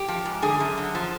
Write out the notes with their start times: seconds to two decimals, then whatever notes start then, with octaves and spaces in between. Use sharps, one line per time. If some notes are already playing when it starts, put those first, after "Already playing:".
Already playing: G4
0.08 F3
0.25 G#2
0.42 D3 G#4
0.60 F#2
0.77 D3
0.95 F3